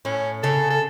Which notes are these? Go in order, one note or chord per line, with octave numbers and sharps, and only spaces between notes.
A2 C#4
C#3 A4
A4